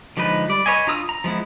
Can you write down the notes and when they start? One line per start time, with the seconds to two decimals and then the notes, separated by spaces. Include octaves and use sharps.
0.17 D3 F3 G#3 D#4 B4
0.48 G3 D5
0.66 B4 C#5 D#5 G#5
0.87 D4 F4 A#5 D#6 E6
1.09 A#5
1.24 F3 G#3 B3 E4